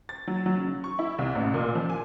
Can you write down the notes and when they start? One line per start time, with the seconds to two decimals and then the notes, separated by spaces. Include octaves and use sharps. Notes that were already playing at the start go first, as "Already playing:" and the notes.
0.09 A6
0.27 F#3
0.46 F#3
0.57 C#3
0.84 C#6
0.99 E4
1.18 C2
1.35 A1
1.54 A#2
1.75 F3
1.90 G#5